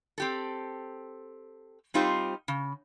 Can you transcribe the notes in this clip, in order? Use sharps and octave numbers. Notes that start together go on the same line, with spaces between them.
C4 G4 A4
G3 C4 D#4 F4 G4 C5
C#3